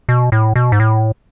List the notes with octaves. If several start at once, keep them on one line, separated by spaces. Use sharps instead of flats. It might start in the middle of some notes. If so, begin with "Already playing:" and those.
B2
A2
B2
G#2
A2